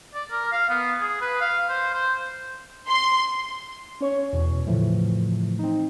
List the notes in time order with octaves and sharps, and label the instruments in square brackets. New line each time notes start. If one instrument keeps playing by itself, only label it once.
[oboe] D5
A#4
F5
B3
G#4
B4
F5
C5
C5
[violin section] C6
[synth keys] C#4 C#5 C#6
E2 B2
A2 C#3 E3 F3 A3
C4 D#4